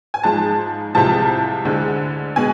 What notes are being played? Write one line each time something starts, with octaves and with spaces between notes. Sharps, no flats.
G#5
G#2 F3 G#3 A5
C2 C3 F3 G#3 A5
D2 D3 G#3
B2 G#3 G#5